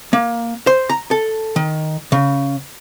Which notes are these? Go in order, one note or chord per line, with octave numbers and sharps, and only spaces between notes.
A#3
C5
A#5
A4
D#3
C#3